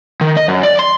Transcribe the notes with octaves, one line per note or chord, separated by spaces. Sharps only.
D#3
D#5
F#2
D5
C6